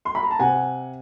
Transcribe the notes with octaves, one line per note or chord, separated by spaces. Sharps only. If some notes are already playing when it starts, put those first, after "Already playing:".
C6
B5
A#5
A5
C3 F#5 G#5